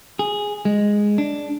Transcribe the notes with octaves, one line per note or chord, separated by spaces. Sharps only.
G#4
G#3
D4